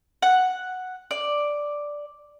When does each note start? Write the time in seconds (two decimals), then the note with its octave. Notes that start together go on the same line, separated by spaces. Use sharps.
0.22 F#5
1.11 D5